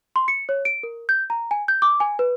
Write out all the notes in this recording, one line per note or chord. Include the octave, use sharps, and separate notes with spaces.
C6
C#7
C#5
D7
A#4
G6
A#5
G#5
G6
D6
G#5
B4